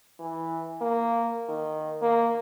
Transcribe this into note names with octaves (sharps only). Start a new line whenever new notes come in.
E3
A#3
D#3
A#3